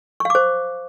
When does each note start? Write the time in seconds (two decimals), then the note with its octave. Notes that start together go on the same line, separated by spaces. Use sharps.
0.20 C#6
0.25 F5
0.30 D6
0.35 C5